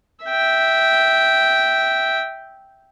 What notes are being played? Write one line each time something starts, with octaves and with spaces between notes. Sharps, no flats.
E5 G5